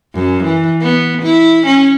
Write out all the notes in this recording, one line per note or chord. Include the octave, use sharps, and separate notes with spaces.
F#2
E3
B3
E4
C#4